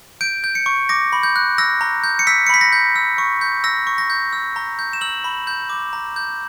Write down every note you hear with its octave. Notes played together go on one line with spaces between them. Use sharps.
G6 D7
G6
C#7
C#6
D6 A#6
B5
G6
F#6
E6 A#6
A#5
G6
C#7
E6 B6
C#7
B5 B6
A#6
G6
E6
C#6
G6
E6 A#6
C#6
A#6
G6
E6
A#5
G6
E7
E6 F#7
B5
G6
D6
A#5
G6